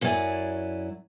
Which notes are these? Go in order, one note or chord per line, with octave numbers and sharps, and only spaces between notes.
F#2 F#3 E4 A#4 D5 G#5